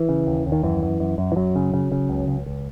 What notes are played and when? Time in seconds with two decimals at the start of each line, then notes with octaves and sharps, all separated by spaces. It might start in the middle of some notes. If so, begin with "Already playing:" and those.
Already playing: E3
0.09 C#3
0.27 D#2
0.46 D#2
0.52 D#3
0.63 F#2 E3
0.83 F#2
1.00 F#2
1.18 F#2
1.32 E3
1.36 F#2 F#3
1.56 C#3
1.74 C#3
1.92 C#3
2.09 C#2
2.28 C#2
2.46 C#2